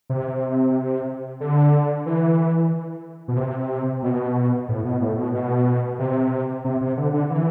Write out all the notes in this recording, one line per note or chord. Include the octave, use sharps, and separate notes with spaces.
C3
D3
E3
B2
C3
B2
A2
B2
A2
B2
B2
C3
C3
C3
D3
D3
E3